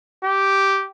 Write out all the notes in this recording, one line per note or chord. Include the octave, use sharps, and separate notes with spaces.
G4